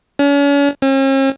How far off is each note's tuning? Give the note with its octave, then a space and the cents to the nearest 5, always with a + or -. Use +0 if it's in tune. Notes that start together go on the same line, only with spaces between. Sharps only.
C#4 +40
C#4 -45